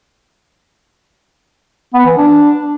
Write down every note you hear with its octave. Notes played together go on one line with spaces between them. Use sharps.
B3
E3
D4